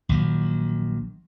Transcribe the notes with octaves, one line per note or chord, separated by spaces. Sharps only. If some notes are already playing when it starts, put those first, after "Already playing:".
A#1 D#3 F#3